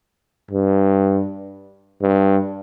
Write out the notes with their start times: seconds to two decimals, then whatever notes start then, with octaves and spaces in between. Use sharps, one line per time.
0.51 G2
2.02 G2